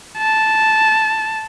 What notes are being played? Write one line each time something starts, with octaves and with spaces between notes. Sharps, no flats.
A5